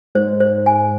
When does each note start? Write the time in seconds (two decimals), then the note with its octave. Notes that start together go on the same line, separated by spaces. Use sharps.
0.15 G#2 C5
0.40 C5
0.66 G#5